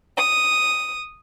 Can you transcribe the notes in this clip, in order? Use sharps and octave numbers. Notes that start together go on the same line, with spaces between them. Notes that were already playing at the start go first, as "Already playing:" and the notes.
D#6